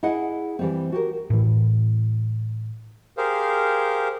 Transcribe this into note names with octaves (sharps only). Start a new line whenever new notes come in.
E4 G#4 D#5 F#5
E3 G3 C4
F#4 G4 A#4
A2 E3
G4 G#4 A#4 C5 F5